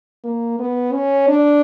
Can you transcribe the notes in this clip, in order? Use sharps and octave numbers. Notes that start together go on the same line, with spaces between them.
A#3
B3
C#4
D4